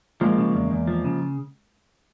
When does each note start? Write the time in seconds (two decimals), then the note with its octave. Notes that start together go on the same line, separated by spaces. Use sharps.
0.21 F3 G#3 A#3
0.38 C#3
0.54 E2
0.71 E2
0.87 F3
1.05 C#3